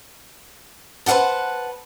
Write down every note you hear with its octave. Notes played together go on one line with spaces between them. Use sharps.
B4 C5 F5 F#5 A5